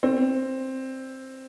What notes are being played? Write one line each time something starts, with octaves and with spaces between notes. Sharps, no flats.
C4